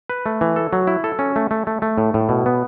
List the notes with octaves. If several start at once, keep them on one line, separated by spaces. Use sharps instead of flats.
B4
A3
E3
A4
F#3
E4
A4
C#4
A3
A3
A3
A3
A2
A2
B2
B3